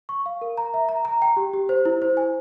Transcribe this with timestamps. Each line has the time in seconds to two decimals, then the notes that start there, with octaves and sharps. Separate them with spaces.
0.09 C#6
0.26 F5
0.41 A#4
0.57 A#5
0.74 E5
0.89 A#5
1.05 A#5
1.22 G5
1.37 G4
1.53 G4
1.69 C5
1.86 E4
2.02 C5
2.17 G#5